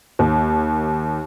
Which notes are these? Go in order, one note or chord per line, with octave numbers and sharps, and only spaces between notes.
D#2